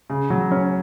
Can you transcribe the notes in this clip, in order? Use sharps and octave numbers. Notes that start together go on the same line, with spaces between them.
C#3
F#3
C#4